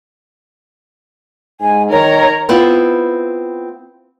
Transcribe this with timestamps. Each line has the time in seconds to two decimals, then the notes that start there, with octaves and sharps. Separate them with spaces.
1.61 G#2 G#5
1.91 D#3 A#4 C#5 A#5
2.49 B3 C4 E4 F4